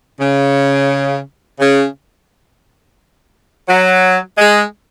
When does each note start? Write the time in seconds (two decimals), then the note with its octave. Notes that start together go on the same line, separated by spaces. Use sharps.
0.21 C#3
1.60 C#3
3.69 F#3
4.38 G#3